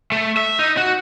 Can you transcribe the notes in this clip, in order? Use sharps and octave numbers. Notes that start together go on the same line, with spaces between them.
A3
E5
D#4
F#4